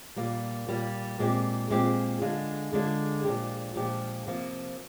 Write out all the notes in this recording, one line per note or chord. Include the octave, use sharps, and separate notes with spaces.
A#2 G3 A#3
A#2 G3 A#3
A#2 G#3 C4 G4
A#2 G#3 C4 G4
D3 G#3 D4 F4 G#4
D3 G#3 D4 F4 G#4
A#2 F3 G#3 D4 G4
A#2 F3 G#3 D4 G4
C3 F3 A#3